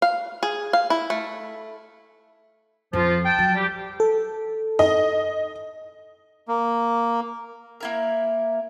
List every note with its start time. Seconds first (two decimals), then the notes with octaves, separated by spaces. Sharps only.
0.02 F5
0.43 G#4
0.73 F5
0.90 E4
1.10 A3
2.93 F2 F3 F4
3.25 G5 A5
3.39 F#3
3.55 G3 G4
4.00 A4
4.79 D#5
6.48 A#3
7.80 A#3 E4 A#4